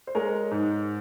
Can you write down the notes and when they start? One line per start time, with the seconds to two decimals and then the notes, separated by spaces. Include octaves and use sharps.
0.07 C5
0.15 G#3 A#4 C#5
0.51 G#2